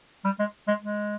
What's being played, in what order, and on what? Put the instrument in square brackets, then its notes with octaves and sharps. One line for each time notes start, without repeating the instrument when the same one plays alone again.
[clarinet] G3
G#3
G#3
G#3